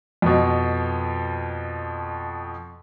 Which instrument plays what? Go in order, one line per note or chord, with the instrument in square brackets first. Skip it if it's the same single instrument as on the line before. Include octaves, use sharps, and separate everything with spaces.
[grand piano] F2 B2